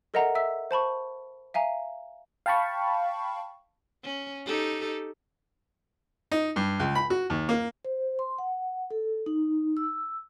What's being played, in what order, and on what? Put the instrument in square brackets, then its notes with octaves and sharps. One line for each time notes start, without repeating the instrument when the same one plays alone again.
[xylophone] A4 A#4 D#5 E5 F#5 A#5
E5 E6 B6
C5 A5 B5 C#6
E5 F5 G#5 A#5
[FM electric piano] F5 G5 A5 B5 C#6
[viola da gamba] C#4
D#4 G4 A4
[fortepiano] D#4
G2
C#2
B5
F#4
D#2
A#3
[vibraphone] C5
C6
F#5
A4
D#4
E6